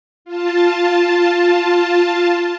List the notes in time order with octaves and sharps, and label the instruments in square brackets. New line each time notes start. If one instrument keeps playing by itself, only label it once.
[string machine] F4 A5